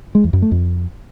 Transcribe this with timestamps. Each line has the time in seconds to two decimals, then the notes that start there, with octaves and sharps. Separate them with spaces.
0.15 G#3
0.24 E2
0.33 F#2
0.42 A3
0.51 F2